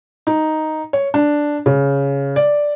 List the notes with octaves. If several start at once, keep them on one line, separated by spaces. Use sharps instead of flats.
D#4
C#5
D4
C#3
D5